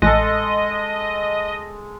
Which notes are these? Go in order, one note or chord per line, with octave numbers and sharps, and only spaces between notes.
A1 G#3 A4 D#5 A#6